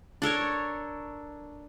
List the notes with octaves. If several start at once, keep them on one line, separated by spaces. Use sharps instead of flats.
D4 A4 A#4 C#5